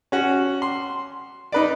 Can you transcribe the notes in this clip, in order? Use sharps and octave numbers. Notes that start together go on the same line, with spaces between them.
C#4 F#4
C6
D#4 B4 D5